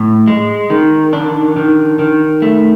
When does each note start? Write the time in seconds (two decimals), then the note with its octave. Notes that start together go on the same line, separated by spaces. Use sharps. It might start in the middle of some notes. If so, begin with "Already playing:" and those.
Already playing: A2
0.28 G#3
0.70 D#3
1.13 D4
1.56 D#3
1.99 D#3
2.42 A3